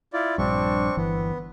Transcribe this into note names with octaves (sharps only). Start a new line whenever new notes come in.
E4 F4 D5
A#1 G2 C4 D4 C#6
G1 E3 B3